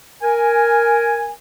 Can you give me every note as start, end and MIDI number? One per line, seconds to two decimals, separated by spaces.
0.22 1.32 70
0.22 1.32 80